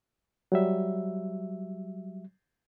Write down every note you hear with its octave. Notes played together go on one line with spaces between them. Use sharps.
F#3 G3 E5